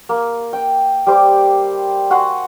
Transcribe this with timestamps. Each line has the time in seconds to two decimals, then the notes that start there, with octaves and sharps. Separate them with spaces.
0.09 A#3
0.53 G5
1.07 G3 C5 D6
2.10 F#4 F#5 G#5 C6